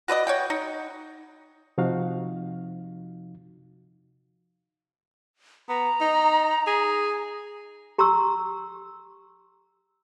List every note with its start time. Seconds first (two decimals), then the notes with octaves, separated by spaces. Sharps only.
0.08 F#4 B4 D5 D#5
0.27 C#5 F#5 G5
0.50 D#4
1.78 C3 F3 D#4 F#4 F5
5.69 B3 A#5
6.01 D#4
6.67 G#4
7.98 G4 A#5 C6 C#6 E6